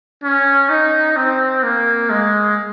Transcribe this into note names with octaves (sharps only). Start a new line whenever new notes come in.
C#4
D#4
C4
A#3
G#3